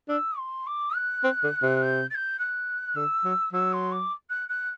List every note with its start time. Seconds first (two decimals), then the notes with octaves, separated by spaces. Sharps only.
0.08 D4 E6
0.38 C6
0.66 D6
0.95 F#6
1.24 C4
1.43 D3
1.62 C3
1.81 G6
2.10 A6
2.14 G6
2.39 F#6
2.95 D3 E6
3.24 F#3
3.53 F#3 E6
3.73 C6
3.91 D6
4.29 F#6
4.49 F#6